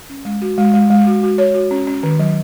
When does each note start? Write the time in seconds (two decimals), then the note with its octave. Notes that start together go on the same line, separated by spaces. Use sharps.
0.09 C#4
0.25 G#3
0.42 F#4
0.58 G#3
0.74 G#3
0.90 G#3
1.07 F#4
1.23 F#4
1.38 C#5
1.55 F#4
1.71 C#4
1.87 C#4
2.03 D#3
2.19 F#3